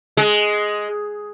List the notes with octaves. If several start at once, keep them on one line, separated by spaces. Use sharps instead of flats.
G#3